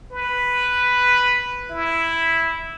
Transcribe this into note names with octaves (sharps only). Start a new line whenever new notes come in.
B4
E4